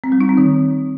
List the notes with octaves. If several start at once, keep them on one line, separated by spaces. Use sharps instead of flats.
C4
G3
D#4
C4
D#3